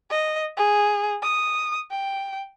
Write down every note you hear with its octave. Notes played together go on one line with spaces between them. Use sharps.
D#5
G#4
D#6
G5